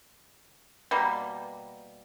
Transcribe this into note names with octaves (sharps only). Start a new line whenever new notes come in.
B2 G3 A#3